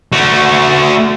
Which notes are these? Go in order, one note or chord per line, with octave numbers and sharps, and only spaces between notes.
A3 F#4